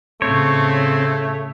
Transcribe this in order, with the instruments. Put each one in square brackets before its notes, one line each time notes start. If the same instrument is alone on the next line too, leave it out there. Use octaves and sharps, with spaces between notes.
[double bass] A2 C#3 [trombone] A3 [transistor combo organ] C4 [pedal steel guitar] C#5